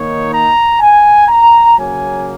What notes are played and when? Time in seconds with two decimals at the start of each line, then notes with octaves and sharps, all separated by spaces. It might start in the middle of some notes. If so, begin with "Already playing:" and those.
Already playing: D#3 A#3 D#4 C#5
0.32 A#5
0.81 G#5
1.29 A#5
1.77 C#3 F#3 A#3 G#5